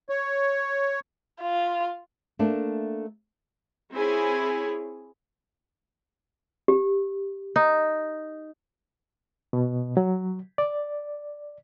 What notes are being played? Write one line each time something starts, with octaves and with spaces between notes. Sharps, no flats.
C#5
F4
A3 A#3 D4
C4 E4 G#4 C#5 G#5
G4
D#4
B2
F#3
D5